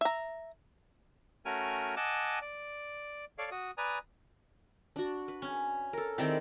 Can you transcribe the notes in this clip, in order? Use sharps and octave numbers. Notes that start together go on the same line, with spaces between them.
E5 A#5
A3 C#4 F#4 A#4 G#5 F6
D#5 F#5 G#5 A5 D6 E6
D5
A4 C#5 D5 F5
F#4 D#6
B4 D5 G#5 A#5 D#6
D4 F#4
B4
C#4
A4 A#4
D#3 C4 E4 G4 D5